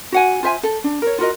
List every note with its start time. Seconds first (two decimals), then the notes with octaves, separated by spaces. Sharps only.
0.12 F#4 F#5 G#5
0.43 F4 C5 E5 G#5
0.63 A4
0.84 D4
1.02 A#4 C#5
1.18 F4 F#4 A#4 D#5